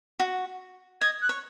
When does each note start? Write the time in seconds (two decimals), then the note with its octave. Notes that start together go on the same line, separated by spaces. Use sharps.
0.20 F#4
1.01 D#5 G#6
1.22 F#6
1.29 C#5